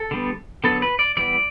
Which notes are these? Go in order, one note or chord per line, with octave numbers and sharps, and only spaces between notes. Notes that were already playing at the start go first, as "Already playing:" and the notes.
Already playing: A4
D3 G3 B3
D3 F#3 B3 A4
B4
D5
E3 G3 B3 D5